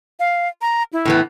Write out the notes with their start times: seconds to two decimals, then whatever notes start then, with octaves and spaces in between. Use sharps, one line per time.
0.20 F5
0.61 A#5
0.93 E4
1.05 A2 E3 B3